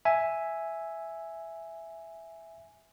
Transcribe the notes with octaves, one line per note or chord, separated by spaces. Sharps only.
E5 G#5